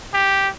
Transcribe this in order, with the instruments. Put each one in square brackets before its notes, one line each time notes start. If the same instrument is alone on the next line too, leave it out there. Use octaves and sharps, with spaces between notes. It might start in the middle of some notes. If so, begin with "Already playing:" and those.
[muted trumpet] G4